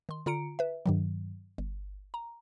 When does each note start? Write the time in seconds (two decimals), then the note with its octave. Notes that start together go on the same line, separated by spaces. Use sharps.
0.09 D#3 C6
0.26 D3 F4 A#5 C#7 D7
0.59 B4 E5
0.86 G2 D#3 F#3
1.58 G1
2.14 A#5